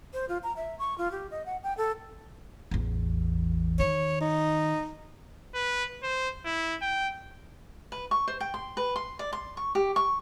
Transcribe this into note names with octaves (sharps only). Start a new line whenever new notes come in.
C5
F4
A#5
E5
C#6
F4
G4
D#5
F#5
G5
A4
A1 E2
D#3 C#5
D#4
B4
C5
E4
G5
B4
C#6
C5
G5
C6
B4
C6
D5
C6
C#6
G4
C#6